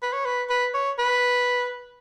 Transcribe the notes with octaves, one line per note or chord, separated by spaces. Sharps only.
B4
C#5
B4
B4
C#5
B4